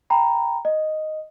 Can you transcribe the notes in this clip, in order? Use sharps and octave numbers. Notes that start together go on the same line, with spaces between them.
G5 A#5 B5
D#5